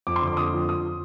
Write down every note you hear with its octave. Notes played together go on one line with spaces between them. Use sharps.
F2 D6
C6
D3
D6
F2 D#6
F3
F3 D#6
F3